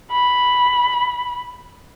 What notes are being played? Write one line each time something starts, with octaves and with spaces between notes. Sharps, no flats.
B5